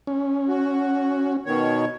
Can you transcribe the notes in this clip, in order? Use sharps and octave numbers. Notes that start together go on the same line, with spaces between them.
C#4
F#4
B2 D#3 C#5